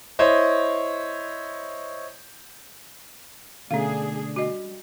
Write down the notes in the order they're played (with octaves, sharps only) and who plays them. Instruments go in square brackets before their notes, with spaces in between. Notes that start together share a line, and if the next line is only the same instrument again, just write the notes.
[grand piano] E4 C5 C#5 D#5
[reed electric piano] B2 D3 A3 [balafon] C#4 F5 [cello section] D4 G#4
[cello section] G3 [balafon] F#4 D#5